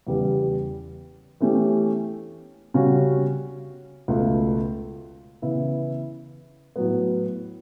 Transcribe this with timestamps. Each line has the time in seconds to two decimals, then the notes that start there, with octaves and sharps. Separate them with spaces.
0.07 E2 C#3 G3 B3
1.41 E3 A3 C#4 G4
2.74 C#3 G3 C#4 F#4
4.08 C#2 B2 A3
5.42 C#3 E3 B3 E4
6.76 A2 F#3 B3